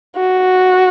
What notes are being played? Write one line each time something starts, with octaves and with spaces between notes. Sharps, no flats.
F#4